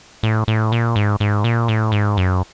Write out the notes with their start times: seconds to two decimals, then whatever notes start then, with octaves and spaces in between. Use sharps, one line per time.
0.23 A2
0.48 A2
0.72 A#2
0.96 G#2
1.20 G#2
1.44 A#2
1.68 A2
1.92 G#2
2.17 F#2